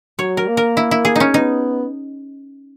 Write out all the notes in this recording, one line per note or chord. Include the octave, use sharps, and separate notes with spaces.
F#3 C#5
A#4
A#3
A#4
E4
E4
G#4
C#4 D#4
B3 D#4